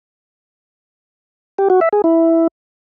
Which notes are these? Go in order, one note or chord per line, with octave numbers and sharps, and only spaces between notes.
G4
F#4
E5
G#4
E4